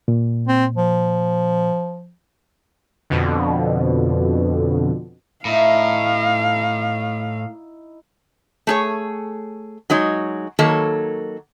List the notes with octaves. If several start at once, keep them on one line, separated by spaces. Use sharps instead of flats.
A#2
C4
F3
F2 B2 D3
A2 D#4 E4 F5 A#5
A3 G#4 C#5
F#3 G#3 D#4 C#5
D#3 F#3 A#3 A4 C#5